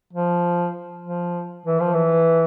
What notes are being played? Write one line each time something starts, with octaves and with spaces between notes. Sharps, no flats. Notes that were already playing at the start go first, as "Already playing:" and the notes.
F3
F3
E3
F3
E3